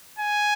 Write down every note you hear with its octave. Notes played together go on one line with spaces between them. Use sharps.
G#5